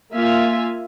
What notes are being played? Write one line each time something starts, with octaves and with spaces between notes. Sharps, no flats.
A#3 F4 E5 F5 G#5